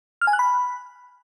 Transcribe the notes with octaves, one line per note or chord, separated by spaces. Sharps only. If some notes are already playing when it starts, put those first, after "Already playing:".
F6
G#5
F#6
B5